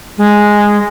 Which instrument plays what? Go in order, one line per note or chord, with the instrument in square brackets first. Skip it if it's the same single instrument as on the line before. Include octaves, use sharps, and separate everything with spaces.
[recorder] G#3